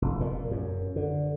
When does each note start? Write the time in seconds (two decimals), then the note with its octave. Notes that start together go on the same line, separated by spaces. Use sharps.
0.02 F1
0.21 A#2
0.51 F#2
0.96 D3